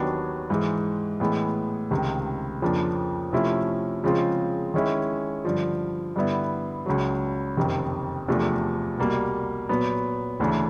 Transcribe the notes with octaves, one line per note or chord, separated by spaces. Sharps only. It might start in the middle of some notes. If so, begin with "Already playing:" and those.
Already playing: D#2 D#3 F#3 B3 D4
G#2 E3 G#3
A2 E3 G#3 B3
C#2 C3 D#3
F2 C#3 F3 A#3 D4
C3 F3 A3 C#4 E4
C#3 F3 G#3 C4 F4
D#3 G#3 C#4 E4
G2 D3 F3
G2 D3 G3 B3 E4
C#2 C#3 F#3
F#1 F2 C3 D#3
E2 C3 F3 A3 D4
C2 B2 G3 A#3
A#2 F#3 B3
D2 C#3 E3 A3 D4